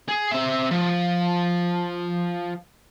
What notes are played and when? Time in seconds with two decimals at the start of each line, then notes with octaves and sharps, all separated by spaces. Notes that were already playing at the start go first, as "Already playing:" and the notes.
0.09 G#4
0.32 C4 E5
0.71 F3